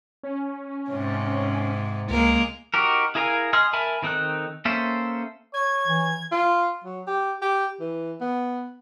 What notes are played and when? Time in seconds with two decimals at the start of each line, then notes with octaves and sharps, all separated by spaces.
0.23 C#4
0.90 G#2 C3
2.10 C#2 G#3 A#3 A#4
2.74 D#4 F#4 G4 A#4
3.15 E4 G#4 A#4 F5 G#5
3.53 G#4 D#5 C6 F6
3.73 A#4 E5 G#5 A5 B5
4.02 D#3 C4 D#4 A4 F#6
4.65 A#3 C#4 A4 C5 E5
5.54 C#5 G#6
5.87 E3
6.32 F4
6.84 F#3
7.07 G4
7.42 G4
7.80 E3
8.21 B3